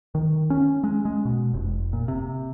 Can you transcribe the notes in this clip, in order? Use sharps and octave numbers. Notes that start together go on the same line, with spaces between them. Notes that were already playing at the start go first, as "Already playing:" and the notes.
D#3
C#4
G#3
G#3
B2
F1
A#2
C3